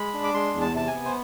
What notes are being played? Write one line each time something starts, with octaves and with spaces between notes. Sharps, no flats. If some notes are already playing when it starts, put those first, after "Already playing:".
Already playing: G#3 B5
D4
D6
G#3 C6
E2
A5
C3 A5
G#5
B3
C5